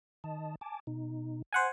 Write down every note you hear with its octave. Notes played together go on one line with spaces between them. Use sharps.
D#3 D#5 A5
G#5 A5 D6
B2 D#4
C5 F#5 G#5